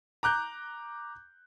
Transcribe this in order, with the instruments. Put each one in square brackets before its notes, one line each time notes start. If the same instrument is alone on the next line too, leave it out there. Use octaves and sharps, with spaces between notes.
[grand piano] A#5 D6 F#6 G6